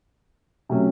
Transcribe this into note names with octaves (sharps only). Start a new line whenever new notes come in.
C3 F#3 A3 C#4